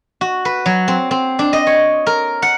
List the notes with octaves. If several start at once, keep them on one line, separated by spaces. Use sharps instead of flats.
F#4
B4
F#3
C4
C4
D4
D#5
C#5
A#4
F#5